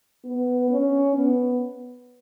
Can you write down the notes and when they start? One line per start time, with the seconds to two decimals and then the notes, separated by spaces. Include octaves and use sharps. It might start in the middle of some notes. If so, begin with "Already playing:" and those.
0.25 B3
0.70 C#4
1.16 B3